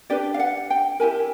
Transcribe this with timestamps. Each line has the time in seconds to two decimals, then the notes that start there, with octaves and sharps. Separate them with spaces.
0.10 D4 G4 B4 D5
0.34 F5
0.39 F#5
0.70 G5
1.00 E4 G4 A#4 G#5